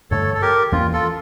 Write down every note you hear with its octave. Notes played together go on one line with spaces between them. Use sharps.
A1 G2 D3 A3 A4 C#5
A4
G4 A#4
E2 E3 A#3 C#4 F4
F4 A4